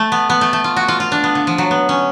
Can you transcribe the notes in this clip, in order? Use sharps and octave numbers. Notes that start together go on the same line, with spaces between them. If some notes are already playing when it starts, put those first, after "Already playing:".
Already playing: A3
B3
B3
A3
A3
F4
F#4
F4
F4
D4
B3
D3
F3
F#3
B3
C#4